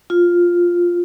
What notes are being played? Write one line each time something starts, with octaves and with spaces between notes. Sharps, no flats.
F4